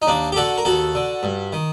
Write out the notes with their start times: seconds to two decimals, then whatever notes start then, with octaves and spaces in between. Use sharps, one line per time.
0.02 D#4
0.07 D#2 A#3 D4
0.32 G4
0.36 D3 F#4 A4
0.58 A#4
0.65 D#2 F#4 A4
0.95 D3
1.23 G2
1.53 D#3